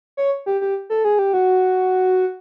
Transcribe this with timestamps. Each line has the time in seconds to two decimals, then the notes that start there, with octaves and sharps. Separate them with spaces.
0.17 C#5
0.46 G4
0.61 G4
0.90 A4
1.05 G#4
1.19 G4
1.33 F#4